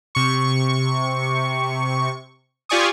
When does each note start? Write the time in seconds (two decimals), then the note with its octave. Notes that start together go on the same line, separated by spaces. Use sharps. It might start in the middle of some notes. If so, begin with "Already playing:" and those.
0.15 C3 C#6
2.69 F4 G4 D5 G#5 C#6 D#6